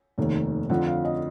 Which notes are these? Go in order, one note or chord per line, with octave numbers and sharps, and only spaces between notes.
F1 D#2 D#3
F2 D3 F3 F#5
F5
D#5